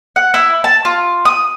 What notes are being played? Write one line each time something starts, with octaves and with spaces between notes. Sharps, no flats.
F#5
E4
A5
F4
D#6